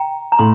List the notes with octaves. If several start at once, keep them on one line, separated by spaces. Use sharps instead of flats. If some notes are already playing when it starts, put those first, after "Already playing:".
Already playing: G5 A#5
A#5
A2 C6